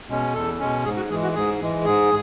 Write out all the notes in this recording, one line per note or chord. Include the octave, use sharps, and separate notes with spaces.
B2 G#3 C#4
E2 A4
B2 G#3 C#4
G#2 G#4
F#4
E3 G#3 G#4
F#4
G#2 G#4
E3 G#3
G#2 G#4